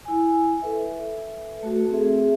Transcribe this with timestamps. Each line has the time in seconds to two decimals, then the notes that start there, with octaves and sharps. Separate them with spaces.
0.05 E4 G#5
0.62 A4 B4 E5
1.63 A3 F#4 A4
1.90 C4 G#4 E5